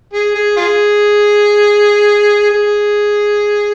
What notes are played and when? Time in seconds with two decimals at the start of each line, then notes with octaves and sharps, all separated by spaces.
0.13 G#4
0.35 G#4
0.57 F4 G#4
2.50 G#4